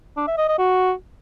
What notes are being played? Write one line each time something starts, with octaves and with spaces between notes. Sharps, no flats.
D4
E5
D#5
D#5
F#4